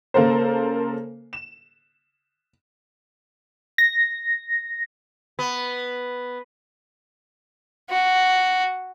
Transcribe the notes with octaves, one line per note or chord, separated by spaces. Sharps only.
C#3 A#3 A4 A#4 C5
E7
A#6
B3
F#4